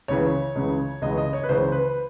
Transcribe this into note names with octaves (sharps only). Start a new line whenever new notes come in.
C#2 C#3 E3 C#5
C#2 C#3 E3
C#2 C#3 E3 D#5
D#5
C#5
B4
C#2 C#3 E3 C5
B4